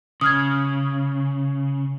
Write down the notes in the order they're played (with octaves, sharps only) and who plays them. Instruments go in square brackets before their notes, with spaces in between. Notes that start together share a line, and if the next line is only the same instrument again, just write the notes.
[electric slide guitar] C#3 [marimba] D#6 F6 G#6